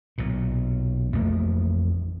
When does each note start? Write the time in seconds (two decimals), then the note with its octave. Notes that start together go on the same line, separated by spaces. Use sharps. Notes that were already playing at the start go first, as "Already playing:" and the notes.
0.18 B1 A#2
1.13 A1 F2 A3 A#3